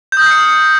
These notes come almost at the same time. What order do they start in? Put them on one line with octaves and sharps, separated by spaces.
G6 D#6 F6 C7 C#7